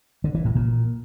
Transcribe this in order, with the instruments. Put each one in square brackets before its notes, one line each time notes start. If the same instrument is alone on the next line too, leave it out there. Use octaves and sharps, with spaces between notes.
[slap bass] D3
E3
A2
A#2